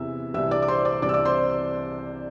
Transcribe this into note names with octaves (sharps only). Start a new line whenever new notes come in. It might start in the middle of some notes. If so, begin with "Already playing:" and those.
Already playing: E2 C3 E3 E5 E6
C2 C3 E3 E5 E6
D5 D6
D6
C5 C6
D5 D6
C2 C3 E3 D5 D6
E6
D5 D6
C5 C6